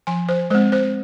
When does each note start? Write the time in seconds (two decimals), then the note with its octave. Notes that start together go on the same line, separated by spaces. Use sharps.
0.07 F3 G#5
0.29 C5
0.50 G#3 C5
0.55 C4
0.72 C5